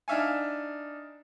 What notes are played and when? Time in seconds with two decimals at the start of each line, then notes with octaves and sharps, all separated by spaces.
0.08 D4 D#4 E5 F5 G#5